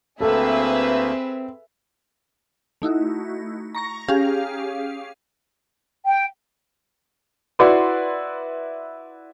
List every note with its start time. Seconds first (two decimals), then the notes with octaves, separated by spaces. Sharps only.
0.21 D2 A3 A#3 C4 G#4 A4 B4 E5
2.82 A3 D#4 E4 F#4
3.75 A#5 C#6 A#6
4.08 C#4 G4 G#4 F5
6.06 G5
7.59 E4 F#4 B4 D5 C6 D6